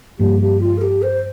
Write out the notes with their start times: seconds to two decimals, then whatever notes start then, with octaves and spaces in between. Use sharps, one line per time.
0.19 G2 F3 A#3 G4
0.40 G4
0.60 F4
0.77 A#4
0.81 G4
1.02 C5